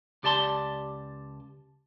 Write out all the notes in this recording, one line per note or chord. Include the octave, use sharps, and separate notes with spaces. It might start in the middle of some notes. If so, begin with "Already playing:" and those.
C#2 G4 D5 A5 C6